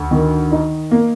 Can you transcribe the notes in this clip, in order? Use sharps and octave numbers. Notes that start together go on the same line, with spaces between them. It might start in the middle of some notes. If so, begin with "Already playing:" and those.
Already playing: D2
D#3
D#4
A#3